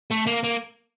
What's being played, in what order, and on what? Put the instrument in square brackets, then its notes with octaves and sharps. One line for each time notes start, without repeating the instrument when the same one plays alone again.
[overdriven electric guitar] A3
A#3
A#3